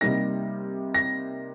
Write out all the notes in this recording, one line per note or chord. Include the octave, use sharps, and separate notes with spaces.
C3 G3 A#3 D#4 A#6
A#6